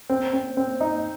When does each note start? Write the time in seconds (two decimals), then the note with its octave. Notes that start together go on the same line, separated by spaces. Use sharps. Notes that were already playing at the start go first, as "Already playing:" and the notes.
0.10 C4
0.33 C4
0.57 C4
0.80 D#4